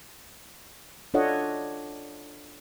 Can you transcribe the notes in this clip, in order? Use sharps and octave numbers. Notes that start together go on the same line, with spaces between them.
D4 F4 A4 C#5 D#5 F#5